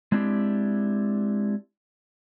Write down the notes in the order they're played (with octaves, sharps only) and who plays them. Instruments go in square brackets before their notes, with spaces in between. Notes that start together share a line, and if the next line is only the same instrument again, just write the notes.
[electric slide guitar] G#3 C4 D4 E4 F#4 G4